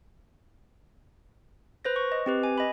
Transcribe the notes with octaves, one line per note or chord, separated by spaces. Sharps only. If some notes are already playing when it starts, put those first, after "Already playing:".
B4 C5 A#6
C#6
D#5
C4 G4 B4
G#5
D#5 B5